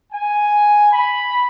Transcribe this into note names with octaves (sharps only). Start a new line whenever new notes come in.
G#5
B5